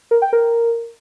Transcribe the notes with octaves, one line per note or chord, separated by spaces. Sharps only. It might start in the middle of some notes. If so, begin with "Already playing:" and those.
A#4
G5
A#4